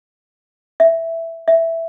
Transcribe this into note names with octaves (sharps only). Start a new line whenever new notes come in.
E5
E5